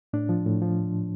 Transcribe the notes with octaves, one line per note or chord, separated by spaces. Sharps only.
A2 D4
F3
A2
F3